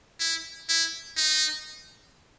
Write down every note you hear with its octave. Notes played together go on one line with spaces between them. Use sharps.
E4
E4
D#4